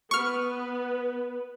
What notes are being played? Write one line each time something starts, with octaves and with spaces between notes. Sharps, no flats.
B3 B4 C#6 F6